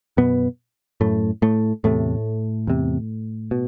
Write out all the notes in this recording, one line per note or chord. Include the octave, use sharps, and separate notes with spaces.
F#2 B2 B3
F#2 A2 A3
A2 A3
E2 A2 C3 A3
E2 C3
B2